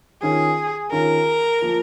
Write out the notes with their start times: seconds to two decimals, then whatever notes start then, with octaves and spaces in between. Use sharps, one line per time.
0.22 D#3 C#4 F4 G#4
0.92 D#3 C#4 F4 A#4
1.61 F3 A#3 F4